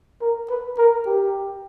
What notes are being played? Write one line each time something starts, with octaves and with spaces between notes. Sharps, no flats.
A#4
B4
A#4
G4